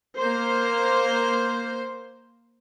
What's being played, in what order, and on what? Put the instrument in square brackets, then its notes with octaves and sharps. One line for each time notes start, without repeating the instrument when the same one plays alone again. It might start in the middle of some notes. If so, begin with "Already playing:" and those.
[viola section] A#3 C5